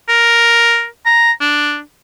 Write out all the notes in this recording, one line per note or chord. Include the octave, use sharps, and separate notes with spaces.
A#4
A#5
D4